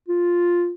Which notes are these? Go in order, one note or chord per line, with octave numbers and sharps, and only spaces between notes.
F4